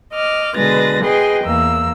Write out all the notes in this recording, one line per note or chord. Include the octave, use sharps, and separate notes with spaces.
D#5 D6 F6
B2 D3 G#3 B4 A6 A#6
G#4 B4 D#5 G5 C6
E2 A#3 E6